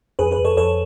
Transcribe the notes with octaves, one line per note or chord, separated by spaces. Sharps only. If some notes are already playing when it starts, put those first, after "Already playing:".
F2 G#4 B4
G#4 B4
F2
A4 C#5
F2 A4 C#5